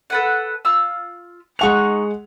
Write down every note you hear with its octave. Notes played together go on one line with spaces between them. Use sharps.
A4 B4 F#5
F4 E6
G#3 D#4 F#5 C#6 F#6 F7